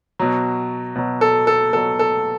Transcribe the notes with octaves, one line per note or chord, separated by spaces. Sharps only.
B2 F#3
B2 F#3
A4
A4
B2 F#3 A4
A4